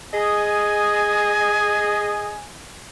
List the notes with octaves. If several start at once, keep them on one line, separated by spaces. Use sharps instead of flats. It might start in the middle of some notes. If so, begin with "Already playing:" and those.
G#4 D#5 G#5